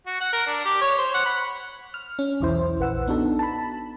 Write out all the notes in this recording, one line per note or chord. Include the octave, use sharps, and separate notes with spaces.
F#4
F#5
A#4
D4
G4
C#5
C5
F#5
B5
F6
C#4
B1 E2 E4 C5
A#1 B4 F#5 E6
B3 D4 D#4 F#4 A4
A5 B5